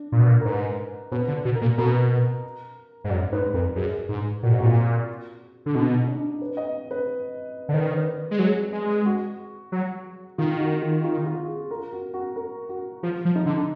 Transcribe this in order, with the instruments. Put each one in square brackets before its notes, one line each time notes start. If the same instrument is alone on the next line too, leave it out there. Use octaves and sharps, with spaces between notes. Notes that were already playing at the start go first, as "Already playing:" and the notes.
Already playing: [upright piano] D4
[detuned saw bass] A#2
B2
A#2
[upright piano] A#4
[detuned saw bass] G#2 [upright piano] B4
[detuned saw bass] B2 [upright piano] B4
[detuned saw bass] D3
B2
[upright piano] A#4
[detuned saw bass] A#2
[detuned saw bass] B2 [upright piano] A#4
[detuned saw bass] G#2
[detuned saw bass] F#2 [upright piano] D5
[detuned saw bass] G#2 [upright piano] B4
[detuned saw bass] F2 [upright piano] A#4
[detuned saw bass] F#2 [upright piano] G#4
[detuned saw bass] G#2
[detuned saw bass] A#2 [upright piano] F#4
[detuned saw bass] G#2
[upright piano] F#4
[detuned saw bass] A#2 [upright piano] F4
[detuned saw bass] D3
[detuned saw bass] B2 [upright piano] D#4
[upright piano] D4
B4
D#5
B4
[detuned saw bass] D3
[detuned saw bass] D#3 [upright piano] B4
[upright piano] D5
B4
[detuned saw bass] G#3
[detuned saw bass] F#3 [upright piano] G#4
[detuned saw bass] G#3
[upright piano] F#4
[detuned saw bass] F#3
[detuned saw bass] D#3 [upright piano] F4
[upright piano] F#4
F4
F4
F4
G#4
A#4
F#4
F#4
A#4
F#4
[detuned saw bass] F3 [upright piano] F4
[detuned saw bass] F3
[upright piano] D#4
[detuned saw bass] D3